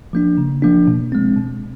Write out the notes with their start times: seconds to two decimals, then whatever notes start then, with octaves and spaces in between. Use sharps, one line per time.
0.13 F3 A#3 D4
0.37 C#3
0.62 F3 A#3 D4
0.87 B2
1.12 G#3 C4
1.37 B2